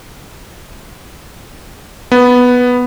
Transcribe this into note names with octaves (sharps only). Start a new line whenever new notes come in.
B3